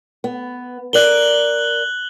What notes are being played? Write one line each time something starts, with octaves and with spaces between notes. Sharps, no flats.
B3
A#4 D5 F#6 F#7 G7